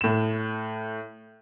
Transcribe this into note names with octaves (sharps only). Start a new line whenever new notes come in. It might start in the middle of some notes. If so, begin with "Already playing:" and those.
A2 E7